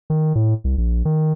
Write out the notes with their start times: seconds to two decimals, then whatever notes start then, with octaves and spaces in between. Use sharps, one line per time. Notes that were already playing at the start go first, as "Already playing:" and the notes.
0.10 D#3
0.35 A2
0.64 C2
0.78 A#1
1.05 D#3